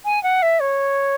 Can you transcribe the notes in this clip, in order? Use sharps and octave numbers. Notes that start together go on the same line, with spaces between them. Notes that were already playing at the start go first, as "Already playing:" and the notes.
G#5
F#5
E5
C#5